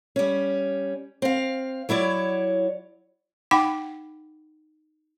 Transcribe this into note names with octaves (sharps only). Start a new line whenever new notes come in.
G3 C#4
C4 F5
F#3 E4 C#5 D5
D#4 F#5 G5 B5 D6